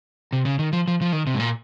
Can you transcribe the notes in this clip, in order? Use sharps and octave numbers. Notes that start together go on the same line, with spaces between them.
C3
C#3
D#3
F3
F3
F3
D#3
C3
G#2
A#2